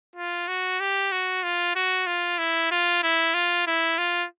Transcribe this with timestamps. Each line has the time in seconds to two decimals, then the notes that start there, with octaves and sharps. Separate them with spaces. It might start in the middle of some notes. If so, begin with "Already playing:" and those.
0.16 F4
0.48 F#4
0.80 G4
1.12 F#4
1.43 F4
1.75 F#4
2.07 F4
2.38 E4
2.71 F4
3.03 E4
3.34 F4
3.67 E4
3.98 F4